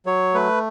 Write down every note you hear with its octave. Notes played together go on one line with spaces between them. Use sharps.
F#3 C#5
A3 B4